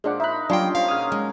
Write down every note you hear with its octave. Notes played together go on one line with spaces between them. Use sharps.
A#2 F3 G#3 D4 F#5 D6
D#4 A#4 E5 B5 F#6
F#3 G3 A#3 C#4 D4 F4 G5 C6
F3 F5
A#2 C#3 F#3 D#6 F6
G#3